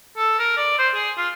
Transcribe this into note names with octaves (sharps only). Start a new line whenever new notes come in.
A4
A#4
D5
C5
G#4
F4